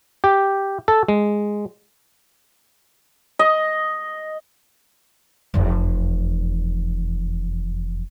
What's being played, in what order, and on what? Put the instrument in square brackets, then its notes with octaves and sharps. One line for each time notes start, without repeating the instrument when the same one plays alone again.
[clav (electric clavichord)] G4
A4
G#3
[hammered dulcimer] D#5
[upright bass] F1 E2